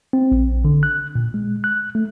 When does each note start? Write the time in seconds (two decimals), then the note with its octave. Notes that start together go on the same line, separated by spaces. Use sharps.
0.13 C4
0.32 A#1
0.65 D3
0.83 F#6
1.15 A#2
1.34 G#3
1.64 F#6
1.95 A3